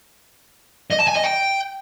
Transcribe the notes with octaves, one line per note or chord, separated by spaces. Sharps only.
D#5
A5
G#5
D#5
G5